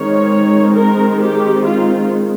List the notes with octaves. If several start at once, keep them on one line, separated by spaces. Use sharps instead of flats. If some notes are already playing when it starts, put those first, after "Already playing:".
Already playing: D#3 G#3 C4 C#5
A#4
G4
F4